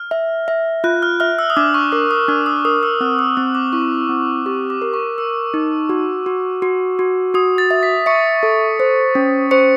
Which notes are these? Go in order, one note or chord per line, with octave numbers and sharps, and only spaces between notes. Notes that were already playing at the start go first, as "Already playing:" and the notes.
Already playing: F6
E5
E5
F4 F#6
F6
E5 F6
E6
D#6
D4 D6
C#6
A#4 D6
D#6
D4 F6
D#6
A#4 D#6
E6
C4 F6
E6
C4 D#6
D6
E4 C#6
C4
G4 C#6
D6
A#4
C#6
A#4 E6
D#4
F#4
F#4
F#4
F#4
F#4 D#6
A6
E5
B6
E5 C#6 C#7
A4
C5
C#4
C5 C#6 C#7